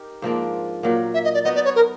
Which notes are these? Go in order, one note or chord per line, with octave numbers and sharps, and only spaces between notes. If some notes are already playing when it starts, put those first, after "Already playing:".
Already playing: D#4 G4 A#4
G#2 F3 A#3 D4
A#2 F#3 A#3
E5
D#5
D5
B3 D#4 F#4 D#5
D5
C#5
A#4